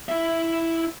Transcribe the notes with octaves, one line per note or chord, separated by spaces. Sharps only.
E4 E5